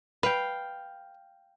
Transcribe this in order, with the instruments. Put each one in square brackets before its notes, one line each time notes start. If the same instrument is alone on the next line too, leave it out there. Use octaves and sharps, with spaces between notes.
[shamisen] B4 [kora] F5 G5